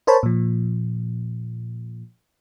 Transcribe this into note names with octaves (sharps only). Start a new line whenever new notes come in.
A#4 C5 C#5 A5 B5
A#2 F3